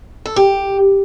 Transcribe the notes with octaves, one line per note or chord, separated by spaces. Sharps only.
A4
G4